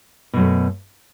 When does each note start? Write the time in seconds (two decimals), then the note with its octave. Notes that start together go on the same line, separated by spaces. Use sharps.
0.33 B2
0.36 F#2
0.39 A3